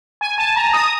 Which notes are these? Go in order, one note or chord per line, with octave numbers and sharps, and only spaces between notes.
G#5
A5
A#5
D#6